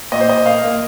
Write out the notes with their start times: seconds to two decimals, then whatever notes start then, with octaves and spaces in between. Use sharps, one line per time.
0.12 A#2 D#5
0.20 C5
0.29 A#2 D#5
0.46 A#3 F5
0.64 A#3